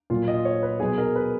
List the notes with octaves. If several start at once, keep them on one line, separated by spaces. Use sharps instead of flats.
A#2 F#3 F4
D#5
C#5
B4
B2 F#3 G#4
A#4
B4